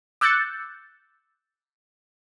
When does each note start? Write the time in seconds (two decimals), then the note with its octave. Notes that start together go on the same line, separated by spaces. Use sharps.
0.21 D6 E6 F#6 G6 A6 C#7